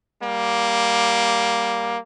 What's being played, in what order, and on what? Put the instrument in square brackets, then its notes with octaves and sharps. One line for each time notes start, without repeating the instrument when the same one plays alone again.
[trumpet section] G3 A#3